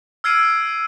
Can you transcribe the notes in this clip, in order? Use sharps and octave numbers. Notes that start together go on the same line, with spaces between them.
E6 F6 G#6 C7 D7 D#7